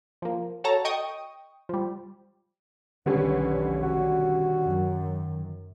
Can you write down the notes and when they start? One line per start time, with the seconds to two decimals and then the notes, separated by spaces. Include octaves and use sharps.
0.22 F3 A#3
0.64 F#4 A4 C#5 A5 A#5
0.85 D#5 G5 C#6 D#6
1.69 F3 G3
3.06 F1 B1 D3 D#3 G3 B3 C#4
3.83 F#4
4.63 F#2